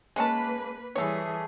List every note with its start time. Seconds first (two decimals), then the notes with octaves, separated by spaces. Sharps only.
0.16 G#3 A#3 C#4 B4 A5
0.96 E3 G3 A3 G#4 C#5